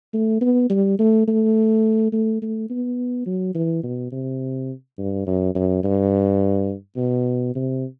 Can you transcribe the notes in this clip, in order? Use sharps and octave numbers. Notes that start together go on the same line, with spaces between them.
A3
B3
G3
A3
A3
A3
A3
B3
F#3
E3
B2
C3
G2
F#2
F#2
G2
B2
C3